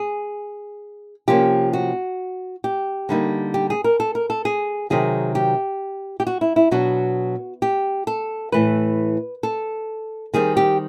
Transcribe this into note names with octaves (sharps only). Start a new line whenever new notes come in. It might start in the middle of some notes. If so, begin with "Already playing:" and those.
Already playing: G#4
C3 F3 A#3 C#4 G4
F#4
G4
D3 G3 A#3 D#4
G4
G#4
A#4
A4
A#4
A4
G#4
C3 D#3 F#3 G#4
G4
G4
F#4
E4
E4
B2 F#3 B3 D4 F#4
G4
A4
A2 E3 A3 B4
A4
D#3 G3 C4 G#4
G4